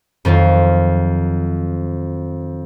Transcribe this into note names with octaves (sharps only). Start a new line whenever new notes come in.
F2 D#3 F#3 F4